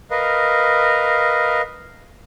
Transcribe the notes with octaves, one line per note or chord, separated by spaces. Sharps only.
A#4 B4 D#5 F5